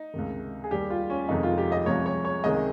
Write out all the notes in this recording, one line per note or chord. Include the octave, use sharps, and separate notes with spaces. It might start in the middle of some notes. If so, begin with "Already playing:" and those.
Already playing: D#4
C#2 C3 D#3
G#4
D#2 D#3 G3 G4
F4
C#4
F2 C3 D#3 G#3 D#4
F4
G4
D#5
C2 C3 F3 G#3 C#5
C#5
C#5
C#2 C3 D#3 G#3 D#5